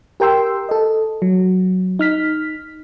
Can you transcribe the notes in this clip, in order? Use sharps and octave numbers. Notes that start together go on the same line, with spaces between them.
G4 A#4 G5 C6 E6
A4 D#5
F#3
D#4 F6 B6